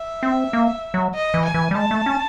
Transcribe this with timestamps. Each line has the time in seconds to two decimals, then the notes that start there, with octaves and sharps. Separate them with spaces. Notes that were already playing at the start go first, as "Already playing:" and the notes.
Already playing: E5
0.23 C4
0.53 A#3
0.94 F#3
1.14 D#5
1.34 E3
1.45 G#5
1.54 E3
1.71 G3
1.75 G#3 A5
1.91 A3
2.06 C#4